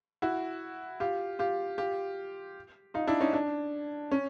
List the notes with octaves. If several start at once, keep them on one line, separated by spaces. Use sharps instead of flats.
E4 F#4
F4 G4
F4 G4
F4 G4
D#4 F4
D4 E4
C#4 D#4
D4
C#4